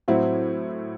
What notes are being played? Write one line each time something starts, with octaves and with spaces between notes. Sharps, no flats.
A2 F#3 C4 E4